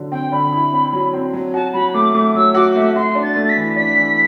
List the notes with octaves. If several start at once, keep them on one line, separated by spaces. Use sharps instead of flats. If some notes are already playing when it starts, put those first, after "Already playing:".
Already playing: D3 F#3
C4 G5
D3 B5
E4
C4
F#3
C4
F#3
F#4 A5
F#3 B5
A3 D6
A3 D6
F#3 E6
F#4 D6
A3 E5
F#4 C6
D4
A6
A3
A6
B6
E3
D4 B6
E3